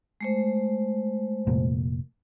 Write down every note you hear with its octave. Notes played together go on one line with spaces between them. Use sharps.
G#3 A3 C5
F1 A#2